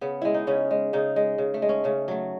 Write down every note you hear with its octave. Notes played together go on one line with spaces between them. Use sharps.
C#3 B3
G#3 E4
D#4
C#3 C#4
G#3
C#3 D#4
G#3
C#3
A3
G#3
C#4
C#3 A3
F#3 A3